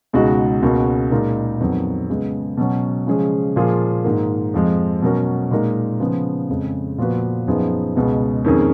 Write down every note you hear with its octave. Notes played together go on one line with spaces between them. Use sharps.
C#2 B2 G#3 D#4 F#4
C#2 B2 A#3 C#4 F#4
A#2 G#3 D#4 A#4
F2 D#3 F#3 B3
C#3 G#3 B3
B2 F#3 C#4
C#3 F3 G#3 C#4 G#4
A#2 F3 A#3 F4 G#4
G#2 D#3 A#3
F2 F3 G#3
B2 F#3 C#4 F#4 A#4
A#2 G#3 D#4 A#4
C#3 F3 B3
F2 C#3 G#3
A#2 F3 B3 F#4 B4
F#2 F3 B3 D#4 G#4
C#2 B2 G#3 B3
F2 D#3 A#3 C#4 G#4